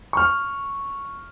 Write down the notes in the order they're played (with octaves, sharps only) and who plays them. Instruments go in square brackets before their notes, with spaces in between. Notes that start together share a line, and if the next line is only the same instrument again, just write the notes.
[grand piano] C#6 F6